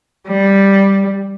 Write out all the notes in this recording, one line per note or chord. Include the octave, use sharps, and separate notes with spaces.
G3